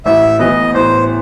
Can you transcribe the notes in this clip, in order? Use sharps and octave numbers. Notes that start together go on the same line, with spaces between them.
A1 E5
A2 E3 B3 D#5
A1 C5